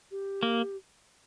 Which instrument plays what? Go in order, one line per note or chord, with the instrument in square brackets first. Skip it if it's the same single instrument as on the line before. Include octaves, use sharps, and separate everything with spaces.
[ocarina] G4
[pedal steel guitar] A#3